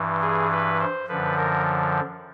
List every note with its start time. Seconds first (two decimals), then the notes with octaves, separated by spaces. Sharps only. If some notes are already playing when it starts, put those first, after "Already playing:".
Already playing: G2 E3
0.22 G#4
0.51 B4
0.80 C5
1.08 F#2 D3 F3 B4
1.37 A#4